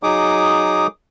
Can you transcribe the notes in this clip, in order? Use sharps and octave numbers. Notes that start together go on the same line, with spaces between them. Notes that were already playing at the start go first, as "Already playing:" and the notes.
F#3 D#4 G#4 D6 D#6